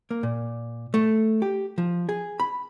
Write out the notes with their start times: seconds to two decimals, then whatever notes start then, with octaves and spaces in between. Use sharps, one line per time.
0.11 A#3
0.23 A#2
0.94 A3
1.42 G4
1.78 F3
2.09 G#4
2.40 B5